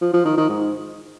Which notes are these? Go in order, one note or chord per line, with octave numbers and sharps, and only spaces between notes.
F3
F3
D#3
D#3
G#2